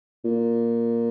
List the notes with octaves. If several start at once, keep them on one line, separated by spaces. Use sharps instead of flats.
A#2